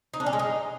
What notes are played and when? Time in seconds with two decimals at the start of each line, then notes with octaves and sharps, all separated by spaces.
0.14 D#4
0.20 D4
0.26 C#4
0.33 G#3
0.39 D#4